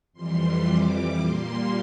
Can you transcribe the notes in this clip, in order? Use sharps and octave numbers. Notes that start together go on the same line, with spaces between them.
F2 E3 G3 C6
D6
A#2 G3 A#3 C6